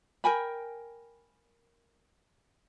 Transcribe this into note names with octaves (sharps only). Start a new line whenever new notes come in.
A#4 G5 G#5 B5